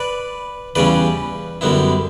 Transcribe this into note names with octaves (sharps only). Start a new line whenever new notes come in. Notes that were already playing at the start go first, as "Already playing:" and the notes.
Already playing: B4 D5
E2 C#3 G3 C#4 B4 D5
F#2 D3 G3 B3 E4